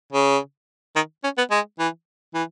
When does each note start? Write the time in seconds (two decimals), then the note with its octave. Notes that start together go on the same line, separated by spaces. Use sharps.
0.13 C#3
0.96 D#3
1.24 C#4
1.38 B3
1.51 G#3
1.79 E3
2.34 E3